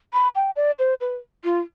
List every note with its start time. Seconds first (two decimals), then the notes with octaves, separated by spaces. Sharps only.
0.13 B5
0.35 G5
0.56 D5
0.79 C5
1.01 B4
1.44 F4